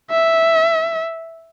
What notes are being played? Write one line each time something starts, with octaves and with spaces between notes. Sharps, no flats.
E5